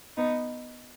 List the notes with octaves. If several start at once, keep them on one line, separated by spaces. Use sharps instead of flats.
B3 D#4